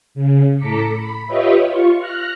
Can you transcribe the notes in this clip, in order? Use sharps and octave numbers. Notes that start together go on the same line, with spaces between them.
C#3
A2 A4 A#5 D6 B6 C#7
B5
F4 G4 B4 C#5 D#5 E5
F4 C#6
F6 F#6 A#6